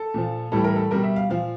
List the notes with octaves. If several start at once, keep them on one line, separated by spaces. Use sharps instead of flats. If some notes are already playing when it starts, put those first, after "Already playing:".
Already playing: A4
A#2 F3
A2 E3 G3 A4
A#4
A4
B2 G3 A#4
E5
F5
A#2 F3 F5